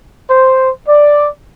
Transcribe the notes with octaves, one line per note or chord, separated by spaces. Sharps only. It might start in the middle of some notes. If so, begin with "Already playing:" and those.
C5
D5